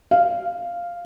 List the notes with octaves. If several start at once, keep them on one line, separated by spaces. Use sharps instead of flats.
F5